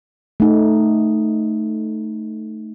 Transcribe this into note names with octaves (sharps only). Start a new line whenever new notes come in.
A3 D#4